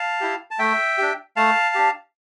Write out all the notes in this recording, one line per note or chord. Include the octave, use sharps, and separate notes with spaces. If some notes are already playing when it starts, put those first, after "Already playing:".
Already playing: F5 A5
E4 G4
A5
A3 E5 G5
D4 G4
A3 F5 A5
D4 G4